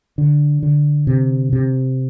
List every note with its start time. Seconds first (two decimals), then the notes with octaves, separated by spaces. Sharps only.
0.18 D3
0.63 D3
1.07 C3
1.53 C3